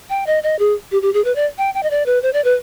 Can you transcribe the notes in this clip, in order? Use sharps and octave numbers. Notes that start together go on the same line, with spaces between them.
G5
D#5
D#5
G#4
G4
G4
G#4
B4
D5
G5
G5
D#5
D5
B4
C5
D5
B4